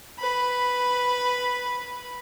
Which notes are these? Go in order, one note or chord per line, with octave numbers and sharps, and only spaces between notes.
B4 B5